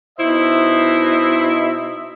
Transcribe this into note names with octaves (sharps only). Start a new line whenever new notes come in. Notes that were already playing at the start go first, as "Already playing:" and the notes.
B2 D#4 E4 C5 D#5 E5